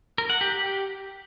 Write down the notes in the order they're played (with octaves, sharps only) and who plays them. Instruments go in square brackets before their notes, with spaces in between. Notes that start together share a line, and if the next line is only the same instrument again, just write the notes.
[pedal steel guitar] A#4
F#5
G4
G4